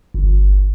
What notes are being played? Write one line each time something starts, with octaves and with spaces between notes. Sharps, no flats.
G1